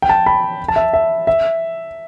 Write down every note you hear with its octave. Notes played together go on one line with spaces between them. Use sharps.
G5
A5
B5
A5
E5
E5
E5